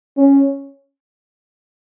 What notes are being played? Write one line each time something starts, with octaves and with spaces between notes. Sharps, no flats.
C#4